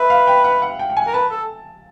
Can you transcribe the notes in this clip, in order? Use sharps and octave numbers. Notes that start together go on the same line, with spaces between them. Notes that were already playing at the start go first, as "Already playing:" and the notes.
Already playing: B4 E5
F5
G5
F#5
F#5
G5
G5
G#5
A#4
B4 A5
A4